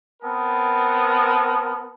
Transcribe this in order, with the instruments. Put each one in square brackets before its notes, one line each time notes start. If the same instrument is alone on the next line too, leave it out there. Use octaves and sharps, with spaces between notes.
[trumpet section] B3 C4 A#4 A5 D#6